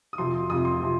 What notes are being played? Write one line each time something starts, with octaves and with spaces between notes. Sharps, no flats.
D#6
F2 C3 F3 C6
F2 C3 F3 D#6
C6
C3 F3